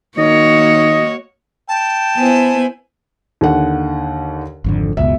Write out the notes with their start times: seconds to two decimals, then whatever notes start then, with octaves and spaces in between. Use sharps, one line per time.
0.18 D#3 A#3 F#4 C#5 D#5
1.69 G5 A5
2.16 B3 E4 C5 G#5
3.41 D#2 D3 F#5
4.64 G#1 F2 D3
4.97 F#1 C#2 B2 E5